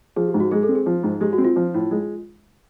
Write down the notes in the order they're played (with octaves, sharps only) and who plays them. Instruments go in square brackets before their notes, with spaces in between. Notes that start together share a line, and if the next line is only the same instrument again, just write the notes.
[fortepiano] F3 [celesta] G#4
[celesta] G4
[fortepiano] G#2
[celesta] F#4
[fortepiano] G#3 [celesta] G#4
[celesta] A4
[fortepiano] C4
[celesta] G#4
[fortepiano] F3
G#2
[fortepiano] G#3 [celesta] G4
[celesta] F#4
[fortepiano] C4
[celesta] F4
[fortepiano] F3
A2
G#3